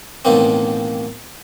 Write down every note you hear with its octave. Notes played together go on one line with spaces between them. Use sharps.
A1 B2 D#3 A#3 C4